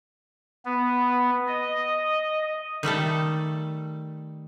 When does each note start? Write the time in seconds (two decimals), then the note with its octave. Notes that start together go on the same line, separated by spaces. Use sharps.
0.65 B3
1.48 D#5
2.83 D#3 G3 A3 A4